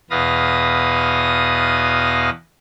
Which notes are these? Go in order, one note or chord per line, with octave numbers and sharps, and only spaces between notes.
E2 B2 B4 F5 D#6 A#6